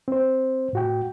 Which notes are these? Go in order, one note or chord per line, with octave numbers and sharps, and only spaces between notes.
C4 C5
A2 F#4 G5